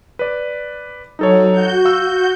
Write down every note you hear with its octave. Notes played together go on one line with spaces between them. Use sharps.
B4 D5
F#3 D#4 A4 C#5
F#4 G6
F5 E6